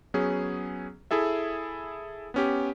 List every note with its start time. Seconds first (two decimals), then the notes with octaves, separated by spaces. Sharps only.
0.14 F#3 B3 C#4 G#4
1.11 E4 G#4 A4 E5
2.34 B3 C#4 G4